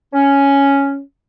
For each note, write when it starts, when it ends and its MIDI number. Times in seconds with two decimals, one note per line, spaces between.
0.13 1.00 61